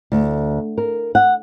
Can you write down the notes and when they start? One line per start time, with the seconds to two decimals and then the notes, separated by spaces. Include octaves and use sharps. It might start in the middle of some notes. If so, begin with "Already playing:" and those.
0.12 D2
0.78 A#4
1.15 F#5